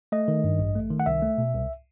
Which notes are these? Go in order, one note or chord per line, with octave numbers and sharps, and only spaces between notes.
A3 D#5
D#3
G2
A1
A3
D#3
F#5
C2 E5
A3
B2
C2